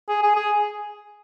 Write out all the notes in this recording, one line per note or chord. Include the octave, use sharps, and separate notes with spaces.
G#4
G#4
G#4